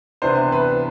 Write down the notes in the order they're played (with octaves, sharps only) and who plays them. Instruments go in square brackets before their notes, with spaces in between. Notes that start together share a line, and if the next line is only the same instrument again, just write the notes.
[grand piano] C3 E3 B3 D4 C5
B4